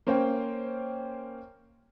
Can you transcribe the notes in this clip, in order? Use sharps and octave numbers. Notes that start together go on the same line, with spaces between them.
A#3 C#4 C5 C#5 G5